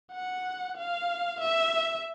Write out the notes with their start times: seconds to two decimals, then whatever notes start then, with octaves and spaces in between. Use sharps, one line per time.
0.12 F#5
0.77 F5
1.41 E5